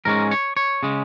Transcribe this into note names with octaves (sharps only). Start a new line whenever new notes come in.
G#2 G#3 C#4 A#4
C#5
C#5
C#3 G#3